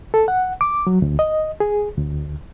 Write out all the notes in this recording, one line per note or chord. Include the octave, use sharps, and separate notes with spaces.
A4
F#5
D6
F#3
D2
D#5
G#4
D2